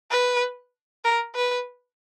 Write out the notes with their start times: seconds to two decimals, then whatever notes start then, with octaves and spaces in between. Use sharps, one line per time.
0.11 B4
1.04 A#4
1.35 B4